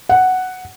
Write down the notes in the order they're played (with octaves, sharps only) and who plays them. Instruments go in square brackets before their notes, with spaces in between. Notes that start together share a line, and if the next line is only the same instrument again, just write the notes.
[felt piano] F#5